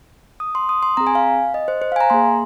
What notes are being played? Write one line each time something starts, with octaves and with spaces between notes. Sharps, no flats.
D#6
C6
D#6
C6
C4 G#4 A#5
G#5
F5
D#5
C5
C5
F5
G#5
A#5
A#3 G#4 C6